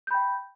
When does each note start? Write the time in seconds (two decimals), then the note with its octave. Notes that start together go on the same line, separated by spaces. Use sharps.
0.07 G6
0.11 B5
0.14 G5